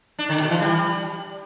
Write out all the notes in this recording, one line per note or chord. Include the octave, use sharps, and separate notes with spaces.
D4
D3
B2
E3
G3